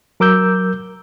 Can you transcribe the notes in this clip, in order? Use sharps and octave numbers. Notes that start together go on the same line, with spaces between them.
F#3 A#4 D6 E6 G6